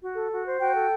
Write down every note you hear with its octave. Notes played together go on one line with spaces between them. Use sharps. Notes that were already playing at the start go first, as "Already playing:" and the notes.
F#4
A4
F#4
C5
F#4 G5
A4